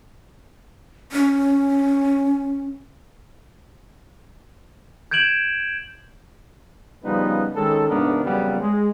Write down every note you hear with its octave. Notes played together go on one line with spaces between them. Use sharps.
C#4
G6 G#6 D7 E7 F#7
C#3 F3 G3 B3 D#4 B4
D#3 G#3 C#4 A4
A#1 G#2 C3 B3 D4 A#4
F2 A#2 C#3 F#3 G3 B3
G#3